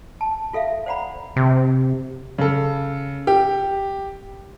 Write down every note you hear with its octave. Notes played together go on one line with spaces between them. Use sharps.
A5
F4 A4 E5 F5
C5 D5 F#5 A#5 B5
C3
C#3 A4
G4